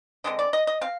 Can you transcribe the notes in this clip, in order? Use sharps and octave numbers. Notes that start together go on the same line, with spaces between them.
D3 G#3 C4 D#5
D5
D#5
D#5
C4 F5